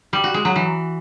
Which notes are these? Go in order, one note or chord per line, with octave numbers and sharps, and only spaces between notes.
G3
F#4
G#3
F#3
E3